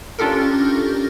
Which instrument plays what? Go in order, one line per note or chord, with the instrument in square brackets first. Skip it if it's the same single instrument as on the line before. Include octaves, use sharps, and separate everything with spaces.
[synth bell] C#4 D4 F4 G4 A4 A#4